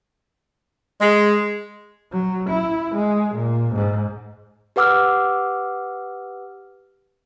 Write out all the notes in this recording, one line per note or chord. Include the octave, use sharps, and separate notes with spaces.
G#3
F#3
E4
G#3
A#2
G#2
G4 B4 F#5 D6 E6 F6